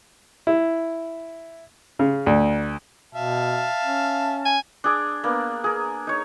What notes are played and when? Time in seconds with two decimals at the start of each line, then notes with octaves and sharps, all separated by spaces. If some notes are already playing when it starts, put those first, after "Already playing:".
0.47 E4
1.99 C#3
2.26 D2
3.15 B2 E5 F5 A5
3.84 C#4
4.45 G#5
4.84 D4 G#4 D6
5.24 A#3 B3 D4
5.64 G#4 A#4
6.07 D#4 C#5